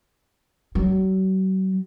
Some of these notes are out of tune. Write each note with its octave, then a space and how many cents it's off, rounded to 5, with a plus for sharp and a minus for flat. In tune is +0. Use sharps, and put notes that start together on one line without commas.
F#3 +40